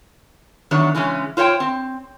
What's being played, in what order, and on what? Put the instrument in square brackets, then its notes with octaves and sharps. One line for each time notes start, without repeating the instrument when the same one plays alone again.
[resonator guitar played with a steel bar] E2 D#3 F#3 D4 C#5
C#3 E3 G#3 C#4
F4 C5 C#5 F#5 G5
C4